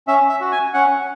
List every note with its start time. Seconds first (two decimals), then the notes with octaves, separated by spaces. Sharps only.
0.08 C#4 E5
0.29 E5
0.41 F#4
0.52 G#5
0.74 C#4 F#5